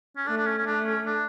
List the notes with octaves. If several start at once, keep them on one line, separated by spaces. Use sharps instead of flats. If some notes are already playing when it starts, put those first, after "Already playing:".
C#4
A3 D4
D4
C#4
C#4
A3 D4
C#4
D4